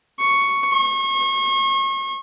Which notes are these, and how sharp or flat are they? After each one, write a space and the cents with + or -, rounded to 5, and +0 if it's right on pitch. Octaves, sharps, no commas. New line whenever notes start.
C#6 +5
C#6 -35